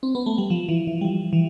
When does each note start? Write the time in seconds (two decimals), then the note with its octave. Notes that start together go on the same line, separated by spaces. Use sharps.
0.03 C4
0.15 B3
0.26 A3
0.38 G3
0.50 F3
0.69 E3
0.87 E3
1.01 G3
1.05 F3
1.33 E3